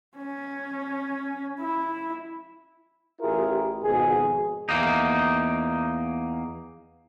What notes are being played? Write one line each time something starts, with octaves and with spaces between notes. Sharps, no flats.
C#4
E4
A1 E4 F4 G4 G#4 A#4
G#1 F2 B2 F#4 G#4
E2 A#3 D#4